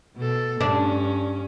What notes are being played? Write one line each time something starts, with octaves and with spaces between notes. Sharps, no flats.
B2 A4
G2 C#4 D4